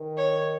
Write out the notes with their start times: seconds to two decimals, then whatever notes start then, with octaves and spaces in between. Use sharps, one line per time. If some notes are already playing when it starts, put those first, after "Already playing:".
Already playing: D#3
0.17 C#5